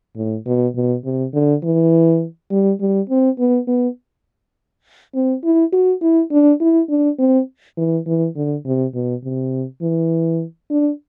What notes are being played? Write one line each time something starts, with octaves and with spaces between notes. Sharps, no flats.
A2
B2
B2
C3
D3
E3
G3
G3
C4
B3
B3
C4
E4
F#4
E4
D4
E4
D4
C4
E3
E3
D3
C3
B2
C3
E3
D4